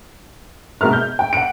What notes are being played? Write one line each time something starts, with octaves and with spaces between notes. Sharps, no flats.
B2 G#3 A#4 E5 F6
G6
G5
F#5 D7